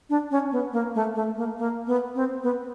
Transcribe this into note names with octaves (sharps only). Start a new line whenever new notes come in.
D4
C#4
B3
A#3
A3
A3
A#3
A#3
B3
C4
B3